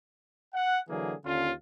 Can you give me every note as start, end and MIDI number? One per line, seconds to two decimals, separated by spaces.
0.54 0.80 78
0.90 1.14 50
0.90 1.14 52
0.90 1.14 54
0.90 1.14 58
0.90 1.14 68
1.25 1.52 39
1.25 1.52 50
1.25 1.52 61
1.25 1.52 65